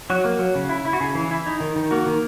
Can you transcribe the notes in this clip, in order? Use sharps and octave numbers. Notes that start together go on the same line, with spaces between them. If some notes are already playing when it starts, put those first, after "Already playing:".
F#3 F#4
A#3
F#3
C#3
E4
E4
F#4
C#3 G#4
E3
E4
D#4
D#3
D#3
A#3 F#4
D#3